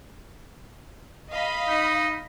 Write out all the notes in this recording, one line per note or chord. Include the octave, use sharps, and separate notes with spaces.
D#5 F5 B5
D#4